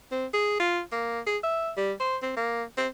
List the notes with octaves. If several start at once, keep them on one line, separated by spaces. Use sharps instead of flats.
C4
G#4
F4
A#3
G#4
E5
G3
C5
C4
A#3
C4